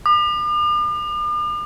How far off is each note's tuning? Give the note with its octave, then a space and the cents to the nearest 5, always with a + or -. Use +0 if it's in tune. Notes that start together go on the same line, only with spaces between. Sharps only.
D6 +45